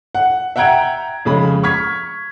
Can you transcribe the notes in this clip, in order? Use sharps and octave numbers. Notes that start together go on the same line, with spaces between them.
F#5
E5 F#5 G5 A#5 G#6 D7
F2 C#3 G#3 B5
C#6 F6 G#6 B6